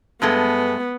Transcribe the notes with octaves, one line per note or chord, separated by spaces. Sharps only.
G2 G#3 A3 B3